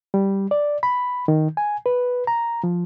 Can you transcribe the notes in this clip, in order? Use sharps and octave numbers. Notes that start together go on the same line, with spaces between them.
G3
D5
B5
D#3
G#5
B4
A#5
F3